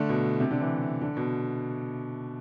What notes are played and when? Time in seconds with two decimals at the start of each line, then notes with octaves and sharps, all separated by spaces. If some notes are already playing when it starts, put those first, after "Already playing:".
Already playing: D3 A3
0.09 B2
0.40 C3
0.51 D3
0.61 E3
1.01 D3
1.17 B2